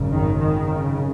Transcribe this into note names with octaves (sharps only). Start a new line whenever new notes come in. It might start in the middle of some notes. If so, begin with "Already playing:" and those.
Already playing: G#1 F#2 C#3
D#3
D#3
C#3